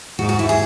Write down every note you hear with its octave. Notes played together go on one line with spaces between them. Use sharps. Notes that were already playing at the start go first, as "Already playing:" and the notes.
G#2 F#4
F#4
E4
G#4